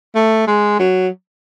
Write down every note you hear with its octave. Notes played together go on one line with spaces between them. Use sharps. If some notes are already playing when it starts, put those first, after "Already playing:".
A3
G#3
F#3